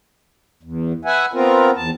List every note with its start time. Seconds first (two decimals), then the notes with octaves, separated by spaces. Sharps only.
0.63 E2
1.05 B4 E5 F#5 G#5
1.34 B3 C4 F4 A#4
1.76 E2 A5